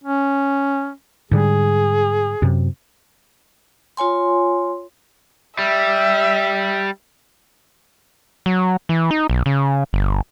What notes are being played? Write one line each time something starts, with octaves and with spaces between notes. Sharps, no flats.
C#4
G#2 D3 G3 G#4
F#2 C3
F4 C#5 G#5 C6
G3 E5
F#3
E3
D#4
B1
C#3
G1